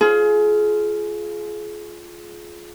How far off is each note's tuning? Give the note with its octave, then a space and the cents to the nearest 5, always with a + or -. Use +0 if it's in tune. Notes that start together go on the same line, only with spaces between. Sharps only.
F4 -5 G#4 +30